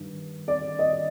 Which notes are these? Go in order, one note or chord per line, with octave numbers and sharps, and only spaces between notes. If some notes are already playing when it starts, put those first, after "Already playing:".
Already playing: G2 D#3
D5
D#5